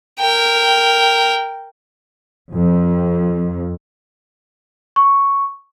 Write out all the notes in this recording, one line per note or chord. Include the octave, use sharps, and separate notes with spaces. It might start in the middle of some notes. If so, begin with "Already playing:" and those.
A#4 G5
F2
C#6